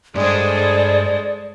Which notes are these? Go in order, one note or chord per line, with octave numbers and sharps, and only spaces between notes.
G2 G#3 D4 G#4 A4 C5 D5